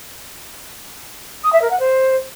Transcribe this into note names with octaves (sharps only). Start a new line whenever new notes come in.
D#6
E5
A#4
F#5
C5